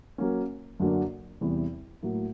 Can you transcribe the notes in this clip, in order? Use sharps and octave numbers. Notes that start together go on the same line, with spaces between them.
F#3 A#3 C#4
F#2 D3 F#3 A#3 D4
E2 C3 E3 G3
A2 F#3 A#3